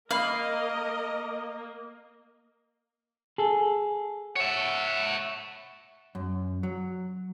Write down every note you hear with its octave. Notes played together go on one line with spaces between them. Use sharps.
A#3 A#4 D#5 F5 B5 C7 F#7
G#4 A4
C#5 E5 F#5
F#2
F#3